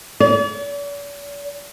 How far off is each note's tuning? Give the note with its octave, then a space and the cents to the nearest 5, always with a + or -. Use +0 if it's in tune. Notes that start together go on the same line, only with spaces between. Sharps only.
D5 -45